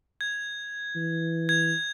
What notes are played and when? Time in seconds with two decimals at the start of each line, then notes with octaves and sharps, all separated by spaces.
0.21 G#6
0.96 E3
1.49 G#6